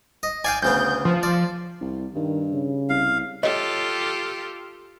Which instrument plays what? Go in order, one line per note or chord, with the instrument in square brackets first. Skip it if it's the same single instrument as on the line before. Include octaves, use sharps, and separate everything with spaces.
[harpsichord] D#5
[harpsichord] D5 F5 G5 [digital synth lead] G#5
[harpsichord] D2 C#3 B3 [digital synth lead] G6
[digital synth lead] F3
[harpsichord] D5
[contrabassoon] C2
[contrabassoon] G2 [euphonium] D#3
[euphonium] C#3
[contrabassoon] C2 [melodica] F5
[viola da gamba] F4 G4 A4 [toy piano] C#5 D#5